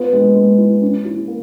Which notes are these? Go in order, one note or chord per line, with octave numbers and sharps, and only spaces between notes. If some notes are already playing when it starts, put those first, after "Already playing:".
Already playing: B3 F4
G#3
G#3
E4
C#4
E4
A#3